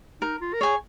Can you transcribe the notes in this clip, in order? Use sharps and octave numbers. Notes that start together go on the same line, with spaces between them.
D#4 A#4
F4
A#4
G#4 C#5 G#5